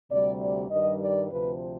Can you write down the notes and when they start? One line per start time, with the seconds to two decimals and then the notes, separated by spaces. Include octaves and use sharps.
0.10 D2 C3 G3 D5
0.40 D5
0.70 G2 D#3 G3 D#5
0.99 D5
1.29 D2 C3 F3 C4 B4